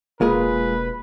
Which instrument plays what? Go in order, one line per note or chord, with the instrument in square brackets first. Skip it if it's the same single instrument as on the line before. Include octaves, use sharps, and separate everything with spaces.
[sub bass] E1 [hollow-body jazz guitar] G#3 F4 G#4 [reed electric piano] A#3 [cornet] B4